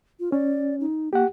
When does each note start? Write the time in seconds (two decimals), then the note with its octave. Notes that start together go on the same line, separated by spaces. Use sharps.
0.20 F4
0.32 C#4 D5
0.80 D#4
1.13 A#3 G4 F#5